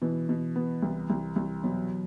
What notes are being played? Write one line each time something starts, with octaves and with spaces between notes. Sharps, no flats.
B2 E3
B2
B3
C2
C2
C2
B2 F#3